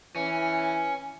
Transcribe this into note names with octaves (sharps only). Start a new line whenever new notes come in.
E3 C#4